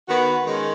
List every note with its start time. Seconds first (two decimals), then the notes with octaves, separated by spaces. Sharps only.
0.09 D#3 B3 F#4
0.45 D#3 G#3 C#4